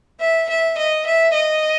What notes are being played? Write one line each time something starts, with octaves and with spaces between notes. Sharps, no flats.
E5
E5
D#5
E5
D#5